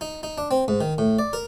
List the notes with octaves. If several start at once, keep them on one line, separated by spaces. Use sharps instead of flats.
D#4
D#4
D4
C4
G#2
D#3
A2
D5
A#4